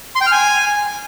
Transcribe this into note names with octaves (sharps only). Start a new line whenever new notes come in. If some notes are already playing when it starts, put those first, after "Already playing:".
C6
G5
F6
G#5